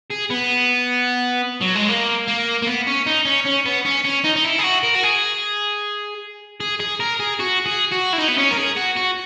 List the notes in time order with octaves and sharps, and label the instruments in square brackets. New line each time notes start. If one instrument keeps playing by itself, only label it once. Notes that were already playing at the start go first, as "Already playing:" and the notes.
[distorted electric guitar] G#4
B3
F#3
G#3
A#3
A#3
A#3
B3
C#4
D#4
C#4
C#4
B3
C#4
C#4
D#4
D#4
E4
G#4
F#4
A#4
F#4
G#4
G#4
G#4
A#4
G#4
F#4
G#4
F#4
E4
D#4
B3
C#4
A#4
G#4
F#4
F#4